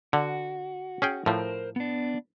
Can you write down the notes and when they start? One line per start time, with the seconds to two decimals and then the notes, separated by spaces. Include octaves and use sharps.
0.13 D3 F#4
1.02 C#4 G#4 G5
1.26 A2 F3 A#4 C5
1.76 B3 D4